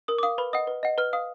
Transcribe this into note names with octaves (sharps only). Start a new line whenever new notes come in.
A#4 D#6
D6
F5 D#6
B4 B5
D#5 F#5 D#6
B4
D#5 F#5
B4 F6
F5 D#6